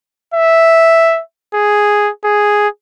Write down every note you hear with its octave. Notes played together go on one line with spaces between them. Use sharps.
E5
G#4
G#4